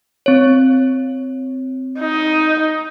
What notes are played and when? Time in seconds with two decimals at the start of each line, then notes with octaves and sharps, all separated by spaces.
0.26 C4 C#5
2.00 D#4